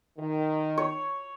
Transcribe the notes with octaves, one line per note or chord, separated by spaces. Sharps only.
D#3
C#5